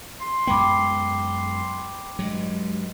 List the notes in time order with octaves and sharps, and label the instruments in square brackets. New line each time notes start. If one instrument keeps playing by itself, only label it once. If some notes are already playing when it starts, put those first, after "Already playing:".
[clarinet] C6
[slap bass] F#2 G#3 B3 [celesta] G5 B5 D6
[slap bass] G2 F#3 [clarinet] G#3